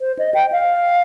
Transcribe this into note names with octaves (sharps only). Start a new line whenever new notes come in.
C5
D#5
G5
F5